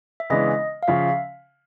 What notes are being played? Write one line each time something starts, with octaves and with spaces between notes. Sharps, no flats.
E5
C#3 E3 G#3 B3 D4 D#5
F5
C#3 F3 E5